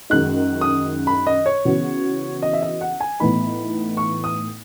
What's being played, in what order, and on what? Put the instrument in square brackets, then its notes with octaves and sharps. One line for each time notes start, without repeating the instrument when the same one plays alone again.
[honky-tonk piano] F#2 D#3 G#3 D#4 [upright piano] F#6
[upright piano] D#6
B5
D#5
C#5
[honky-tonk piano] C#3 E3 B3 F#4
[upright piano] D#5
E5
D#5
F#5
G#5
[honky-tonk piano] A2 E3 B3 D#4 [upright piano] B5
[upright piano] C#6
D#6